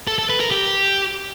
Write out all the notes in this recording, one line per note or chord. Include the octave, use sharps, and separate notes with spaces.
A4
A4
B4
A#4
G4